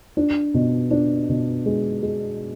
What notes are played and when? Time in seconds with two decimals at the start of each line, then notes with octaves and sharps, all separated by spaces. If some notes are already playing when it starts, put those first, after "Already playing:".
0.17 D4
0.54 B2
0.91 D4
1.29 B2
1.66 G#3
2.03 G#3